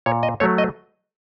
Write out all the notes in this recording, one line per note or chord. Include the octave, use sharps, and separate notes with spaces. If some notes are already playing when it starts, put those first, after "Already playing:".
A#2 C#5
D#5
F#3 A3 C#5
D#5